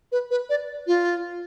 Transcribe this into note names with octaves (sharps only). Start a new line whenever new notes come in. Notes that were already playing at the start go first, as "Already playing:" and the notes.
B4
B4
D5
F4